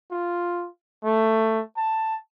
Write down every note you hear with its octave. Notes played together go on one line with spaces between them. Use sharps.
F4
A3
A5